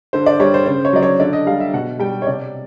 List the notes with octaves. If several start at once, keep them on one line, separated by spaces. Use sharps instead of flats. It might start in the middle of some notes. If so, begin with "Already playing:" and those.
D3 C5
D5
G3 C#5
C5
C#3 C5
C#5
F#3 D5
C#5
D3 D5
D#5
G3 F5
E5
B2 F#5
G3 G5
C#5
C3 D5